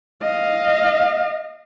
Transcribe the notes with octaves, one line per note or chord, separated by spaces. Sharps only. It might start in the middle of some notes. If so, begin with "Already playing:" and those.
D#5 F5